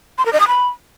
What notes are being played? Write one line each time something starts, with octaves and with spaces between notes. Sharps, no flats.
C6
A#4
D#5
D#6
B5